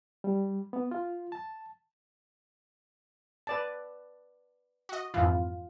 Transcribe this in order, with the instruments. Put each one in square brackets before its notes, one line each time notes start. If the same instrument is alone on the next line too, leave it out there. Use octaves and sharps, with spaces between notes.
[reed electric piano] G3
B3
F4
A5
[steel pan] B4 D5 A5
[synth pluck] F#4 D#5
[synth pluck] F2 G#2 E3 [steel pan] F4